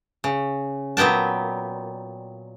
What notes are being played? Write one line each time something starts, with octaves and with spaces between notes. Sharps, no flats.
C#3
A#2 F#3 B3 G5 A5